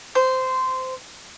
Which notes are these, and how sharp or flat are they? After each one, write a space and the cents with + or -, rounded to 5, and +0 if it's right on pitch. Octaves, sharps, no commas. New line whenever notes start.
C5 -15